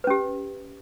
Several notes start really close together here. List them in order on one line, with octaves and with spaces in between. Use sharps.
B4 C#4 G4